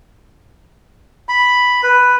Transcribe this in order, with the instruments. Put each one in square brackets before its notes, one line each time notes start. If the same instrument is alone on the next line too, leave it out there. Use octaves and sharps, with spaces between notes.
[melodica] B5
B4